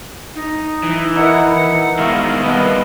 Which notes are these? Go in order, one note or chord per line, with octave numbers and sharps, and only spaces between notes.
D#4
E3
D#4 E4 A#4 F#5
B2 D#3 G#3 E5 F5 C#6
G3 A#3 B3 B4 D#5 A5